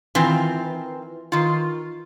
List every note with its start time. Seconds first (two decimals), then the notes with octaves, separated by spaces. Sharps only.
0.15 D#3 E3 C4 F4
1.32 D#3 F4